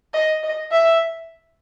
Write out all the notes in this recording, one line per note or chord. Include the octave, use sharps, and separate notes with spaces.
D#5
D#5
E5